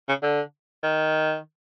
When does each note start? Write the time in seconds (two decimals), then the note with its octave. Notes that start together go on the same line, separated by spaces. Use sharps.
0.09 C#3
0.23 D3
0.83 D#3